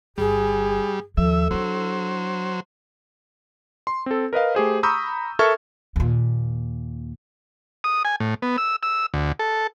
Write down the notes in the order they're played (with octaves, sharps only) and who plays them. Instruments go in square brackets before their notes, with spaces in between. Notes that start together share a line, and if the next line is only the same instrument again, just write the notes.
[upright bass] G1 [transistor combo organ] G3 [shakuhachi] G#4
[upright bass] D#2 F3 [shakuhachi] A4 [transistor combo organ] E5
[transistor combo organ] F#3 C5 [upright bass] D4 E4
[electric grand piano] C6
C4 A4
A#4 B4 D#5 F5
A3 G4 G#4 C5
A#5 B5 C#6 D#6 E6 G6
A4 A#4 E5 C#6 F6 G#6
[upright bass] D#2 A#2
[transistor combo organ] D#6
G#5
A2
B3
E6
E6
D2
A4